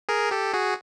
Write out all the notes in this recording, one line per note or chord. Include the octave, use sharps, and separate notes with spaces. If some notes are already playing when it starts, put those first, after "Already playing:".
G#4 A#4
G4 A4
F#4 G#4